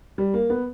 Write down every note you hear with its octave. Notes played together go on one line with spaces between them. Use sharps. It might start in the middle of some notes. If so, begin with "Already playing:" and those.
G3
A#3
B3